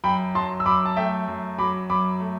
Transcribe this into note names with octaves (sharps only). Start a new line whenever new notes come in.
F#2 G5 B5
F#3 A5 C6
E6
F#2 B5 D6
A5
A3 E5 G5
F#2
F#3 B5 D6
F#2 B5 D6
A3